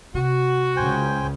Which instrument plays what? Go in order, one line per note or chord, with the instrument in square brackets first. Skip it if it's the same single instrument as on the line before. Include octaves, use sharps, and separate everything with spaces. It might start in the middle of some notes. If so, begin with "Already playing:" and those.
[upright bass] C3 [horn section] F#4
[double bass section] C#2 C#3 [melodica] C5 G5 G#5